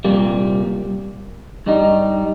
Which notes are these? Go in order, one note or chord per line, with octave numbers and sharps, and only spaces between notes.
C2 A#2 G3 A#3
G2 G3 D#4